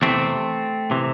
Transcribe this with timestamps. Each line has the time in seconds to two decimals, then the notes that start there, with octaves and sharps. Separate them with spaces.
0.02 E2 C3 E3 A3 C4
0.91 C3 E3